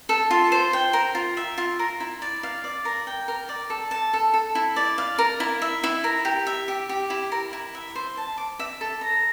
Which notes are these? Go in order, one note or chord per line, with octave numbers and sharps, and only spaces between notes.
A4
F4
C5
G5
A#4
F4
E5
F4
A#4
E4
D5
F5
D5
A#4
G5
A#4
D5
A4
A5
A4
A4
E4
D5
F5
A#4
E4
E5
E4
A#4
G4
E5
G4
G4
E4
A#4
E4
E5
C5
A5
D6
E5
A4
A#5